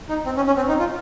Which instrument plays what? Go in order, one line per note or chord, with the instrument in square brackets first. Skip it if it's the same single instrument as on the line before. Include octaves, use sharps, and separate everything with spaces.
[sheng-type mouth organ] D#4
C4
C#4
C#4
C4
D#4
F4